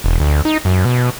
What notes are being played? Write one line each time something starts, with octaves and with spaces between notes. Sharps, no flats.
E1
D2
D#4
F#2
B2